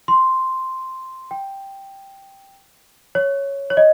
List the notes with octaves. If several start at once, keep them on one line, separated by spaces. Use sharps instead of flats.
C6
G5
C#5
C#5
D#5